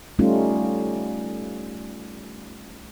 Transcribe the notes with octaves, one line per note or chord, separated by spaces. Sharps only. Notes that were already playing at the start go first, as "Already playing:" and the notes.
G3 A3 C#4 D#4 F4